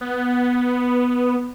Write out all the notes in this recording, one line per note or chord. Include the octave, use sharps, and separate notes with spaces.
B3